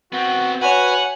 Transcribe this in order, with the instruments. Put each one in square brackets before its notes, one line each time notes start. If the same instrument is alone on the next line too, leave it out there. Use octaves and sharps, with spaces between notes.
[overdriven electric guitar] B3 C4 [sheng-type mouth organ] F#4
[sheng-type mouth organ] F#4 B4 [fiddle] C#5 G#5 [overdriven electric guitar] F#5